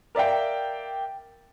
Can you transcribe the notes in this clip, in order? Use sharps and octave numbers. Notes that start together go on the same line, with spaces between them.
A#4 D5 E5 F5 G5